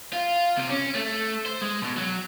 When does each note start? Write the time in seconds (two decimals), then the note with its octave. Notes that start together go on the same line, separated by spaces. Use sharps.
0.13 F4
0.57 C3
0.70 C#4
0.95 A3
1.46 C5
1.62 G#3
1.82 B2
1.97 F#3